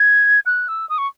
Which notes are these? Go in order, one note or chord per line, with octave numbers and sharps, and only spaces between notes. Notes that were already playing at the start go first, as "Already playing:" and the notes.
Already playing: G#6
F#6
E6
D#6
C#6